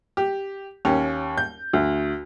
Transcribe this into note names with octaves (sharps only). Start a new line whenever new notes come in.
G4
D#2 C#4
G6
D2